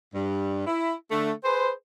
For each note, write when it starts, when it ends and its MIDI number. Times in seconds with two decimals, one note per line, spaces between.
0.14 0.63 43
0.66 0.94 64
1.10 1.31 50
1.10 1.31 57
1.44 1.71 68
1.44 1.71 71
1.44 1.71 72